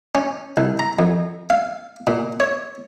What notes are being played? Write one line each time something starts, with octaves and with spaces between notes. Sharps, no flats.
C#4
C2
A#5
F2
F5
A#2
C#5